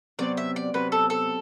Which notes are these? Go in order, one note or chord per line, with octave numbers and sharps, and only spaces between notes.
C3 F#3 B3 F#4 C5 D5
E5
D5
C3 F#3 B3 F#4 B4 C5
A4
A4